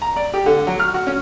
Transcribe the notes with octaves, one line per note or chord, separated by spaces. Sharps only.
A#5
D5
G4
D3
F#3
F6
F#4
C#4